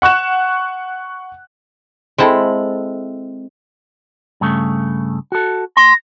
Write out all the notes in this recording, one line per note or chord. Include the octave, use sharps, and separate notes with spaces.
F#5 C#6 F#6 E7
G#3 C4 E4 A4
G2 C#3 A3
F#4 A4
C6 A#6